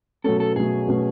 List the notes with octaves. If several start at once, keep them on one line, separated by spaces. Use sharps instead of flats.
B2 F#3 A3 C#4 A4
A4
B2 F#3 A3 C#4 G#4
B2 F#3 A3 C#4